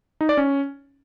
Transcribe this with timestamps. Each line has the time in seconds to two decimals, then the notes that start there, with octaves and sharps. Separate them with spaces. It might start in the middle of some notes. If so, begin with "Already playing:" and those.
0.21 D#4
0.29 D5
0.37 C#4